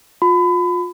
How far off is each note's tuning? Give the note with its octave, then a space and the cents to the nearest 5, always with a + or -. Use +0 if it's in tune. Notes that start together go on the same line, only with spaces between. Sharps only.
F4 +30 B5 +30